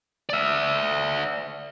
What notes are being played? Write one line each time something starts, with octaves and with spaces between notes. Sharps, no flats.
D5 E5